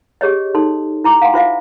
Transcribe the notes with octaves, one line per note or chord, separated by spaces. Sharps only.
G4 G#4 C#5 D#5
D#4 A4 C6
E4 A#5 D6
F5 F#5 G#5 C6
F4 C5 E5 F5